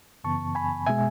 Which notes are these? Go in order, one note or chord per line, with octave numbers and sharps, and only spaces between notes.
F#2 C#3 E3 B3 A5 C#6
G#5 B5
B2 G#3 E5 G#5